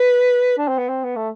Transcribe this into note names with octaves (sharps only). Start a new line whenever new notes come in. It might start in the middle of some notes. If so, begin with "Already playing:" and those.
Already playing: B4
D4
C4
B3
C4
B3
A3